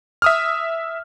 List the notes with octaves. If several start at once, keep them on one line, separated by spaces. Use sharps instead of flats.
E5 D#6 F6